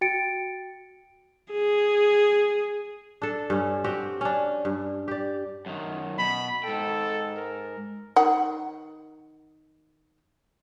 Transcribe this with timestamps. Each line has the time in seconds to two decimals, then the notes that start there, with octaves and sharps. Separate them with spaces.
0.01 F#4 G5 A6 C#7 D7
1.52 G#4
3.22 D4 A4
3.50 G2 C#4
3.84 C4 F#4 G4
4.21 C#4 D4
4.65 G2
5.08 G4 D5
5.66 F#2 D#3
6.19 B2 B5
6.64 G#2 A4 G5
7.36 A#4
8.16 D#3 F#5